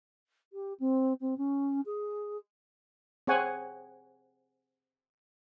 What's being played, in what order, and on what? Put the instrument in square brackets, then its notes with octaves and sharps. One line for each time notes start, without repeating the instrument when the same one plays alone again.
[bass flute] G4
C4
C4
C#4
G#4
[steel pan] C4 G#4 C#5 F#5 G#5